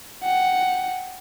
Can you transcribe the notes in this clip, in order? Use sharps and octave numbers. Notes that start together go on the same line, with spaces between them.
F#5 G5